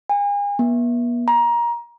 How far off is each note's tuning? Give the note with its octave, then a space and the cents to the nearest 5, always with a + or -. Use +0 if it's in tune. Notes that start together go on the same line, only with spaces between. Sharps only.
G#5 -40
B3 -45
A#5 +20